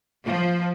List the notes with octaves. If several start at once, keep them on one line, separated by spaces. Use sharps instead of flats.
F3